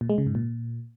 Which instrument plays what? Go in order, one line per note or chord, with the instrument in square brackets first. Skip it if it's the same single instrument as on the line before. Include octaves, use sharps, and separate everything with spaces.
[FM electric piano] A#2
G#3
C#3
G#2
A#2